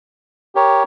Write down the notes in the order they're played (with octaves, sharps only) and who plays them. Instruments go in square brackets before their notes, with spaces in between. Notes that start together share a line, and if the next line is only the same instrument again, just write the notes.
[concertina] G4 A#4 C#5